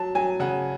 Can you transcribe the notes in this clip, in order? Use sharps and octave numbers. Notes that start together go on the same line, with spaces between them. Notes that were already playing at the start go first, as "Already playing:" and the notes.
Already playing: F#3 A5
F#3 G#5
C#3 F#5